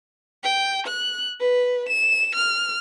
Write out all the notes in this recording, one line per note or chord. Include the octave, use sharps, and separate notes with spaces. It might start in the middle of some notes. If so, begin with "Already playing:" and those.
G5
F#6
B4
E7
F6